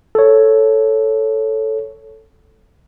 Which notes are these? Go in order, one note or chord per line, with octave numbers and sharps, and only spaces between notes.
A4 C#5